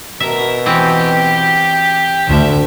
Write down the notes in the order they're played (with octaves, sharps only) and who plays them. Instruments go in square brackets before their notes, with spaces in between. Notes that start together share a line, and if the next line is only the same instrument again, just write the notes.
[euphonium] B2 [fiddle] A#4 [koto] E5
[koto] E3 C4 [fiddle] G4
[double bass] D2 [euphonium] D3 [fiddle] E5